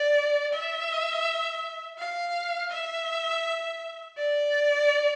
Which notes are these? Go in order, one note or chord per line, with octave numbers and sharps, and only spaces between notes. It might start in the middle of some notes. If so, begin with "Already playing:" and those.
Already playing: D5
E5
F5
E5
D5